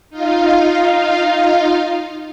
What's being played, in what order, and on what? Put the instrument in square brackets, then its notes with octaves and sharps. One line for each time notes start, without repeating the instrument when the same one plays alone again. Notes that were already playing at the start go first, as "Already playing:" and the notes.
[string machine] D#4 F4 F5